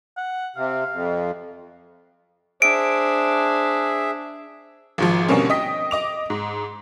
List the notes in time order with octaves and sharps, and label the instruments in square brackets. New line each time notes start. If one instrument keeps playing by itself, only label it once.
[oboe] F#5
[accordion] C3 [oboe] F5
[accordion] F2
[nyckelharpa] D4 [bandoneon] G#4 E5 [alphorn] C5 [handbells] D7
[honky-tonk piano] G#1 G#2 F3
B2 D3 G3 A#3 C4 C#4
D#5 G5 D#6 B6
D#5 D6 F7
G#2